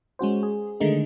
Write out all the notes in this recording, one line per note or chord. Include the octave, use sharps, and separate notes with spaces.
G#3 C#4 F#4 C5
G#4
D3 D#3 G#3 A3 D#4